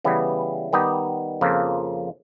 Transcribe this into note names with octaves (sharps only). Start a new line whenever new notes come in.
C#3 E3 G3 B3
D#3 G3 B3 D#4 G4
F2 C#3 F3 A#3